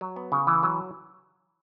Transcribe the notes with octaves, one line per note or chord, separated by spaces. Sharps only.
F#3
B3
C#3
E3
F#3